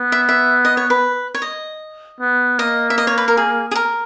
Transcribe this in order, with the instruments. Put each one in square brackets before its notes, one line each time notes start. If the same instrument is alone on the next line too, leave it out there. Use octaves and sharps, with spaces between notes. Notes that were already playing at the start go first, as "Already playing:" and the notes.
Already playing: [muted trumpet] B3
[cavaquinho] E5
E5
D#5
C#5
B4
C#5
D#5
[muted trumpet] B3
[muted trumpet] A#3 [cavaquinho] D#5
[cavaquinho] E5
D#5
C#5
B4
A#4
G#4
G#4
A#4